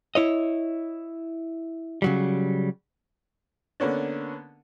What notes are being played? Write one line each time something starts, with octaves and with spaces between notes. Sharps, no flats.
E4 C#5 D#5
C#3 F#3 G3
D3 A#3 B3 C#4 D4